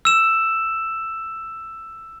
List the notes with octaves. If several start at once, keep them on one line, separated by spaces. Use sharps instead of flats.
E6 E7